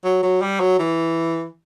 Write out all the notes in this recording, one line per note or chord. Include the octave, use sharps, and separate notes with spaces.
F#3
F#3
G3
F#3
E3